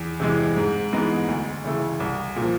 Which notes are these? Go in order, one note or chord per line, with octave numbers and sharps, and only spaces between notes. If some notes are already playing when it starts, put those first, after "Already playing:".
Already playing: E2
C3 E3 G#3
G#2
E3 G#3 B3 D#4
D2
C#3 E3 A3
C2
A#2
F3